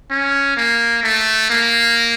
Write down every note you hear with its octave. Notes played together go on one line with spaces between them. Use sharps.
C#4
A#3
A3
A#3